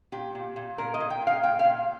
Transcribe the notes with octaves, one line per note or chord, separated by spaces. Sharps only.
A#2 G4
A#2
A#2
A#2 A#4
D#5
A#2
G5
A#2
F5
A#2 G5
F5
A#2